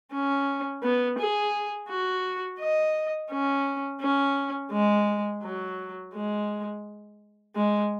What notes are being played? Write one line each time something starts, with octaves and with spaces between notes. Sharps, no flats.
C#4
B3
G#4
F#4
D#5
C#4
C#4
G#3
F#3
G#3
G#3